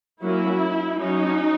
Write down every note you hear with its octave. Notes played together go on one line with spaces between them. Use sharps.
F#3 A#3 C#4 E4
F#3 C#4 D#4